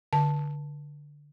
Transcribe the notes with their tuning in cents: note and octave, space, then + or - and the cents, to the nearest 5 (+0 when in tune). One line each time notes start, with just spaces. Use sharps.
D3 -5 A5 +0